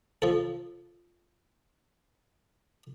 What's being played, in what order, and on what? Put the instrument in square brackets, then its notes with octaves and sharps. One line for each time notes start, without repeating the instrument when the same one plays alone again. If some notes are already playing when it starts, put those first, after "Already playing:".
[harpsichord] F3 A4